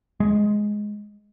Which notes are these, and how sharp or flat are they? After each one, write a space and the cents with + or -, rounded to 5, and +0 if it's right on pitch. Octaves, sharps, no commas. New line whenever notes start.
G#3 +5